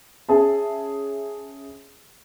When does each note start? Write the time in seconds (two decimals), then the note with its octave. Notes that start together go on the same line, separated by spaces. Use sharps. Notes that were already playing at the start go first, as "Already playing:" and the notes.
0.29 C#4 G#4 E5 A5